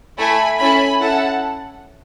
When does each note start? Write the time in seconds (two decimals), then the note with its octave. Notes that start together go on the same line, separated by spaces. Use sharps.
0.18 A3 E4 A4 G#5 B5
0.59 C#4 E4 A4 G#5 B5
1.01 C#4 E4 A4 F#5 A5